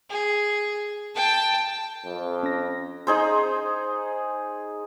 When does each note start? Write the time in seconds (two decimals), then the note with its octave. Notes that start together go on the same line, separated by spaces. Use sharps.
0.10 G#4
1.15 G5 A5
2.05 F2
2.43 C#4 A#6
3.07 D#4 G#4 C5